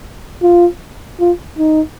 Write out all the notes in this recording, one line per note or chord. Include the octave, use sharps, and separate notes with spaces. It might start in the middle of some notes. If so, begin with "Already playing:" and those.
F4
F4
D#4